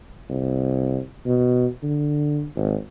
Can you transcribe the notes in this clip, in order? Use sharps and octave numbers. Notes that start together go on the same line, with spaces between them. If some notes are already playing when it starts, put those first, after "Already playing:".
C2
B2
D3
G#1